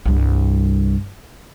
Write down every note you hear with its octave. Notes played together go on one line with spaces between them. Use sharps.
C2 G2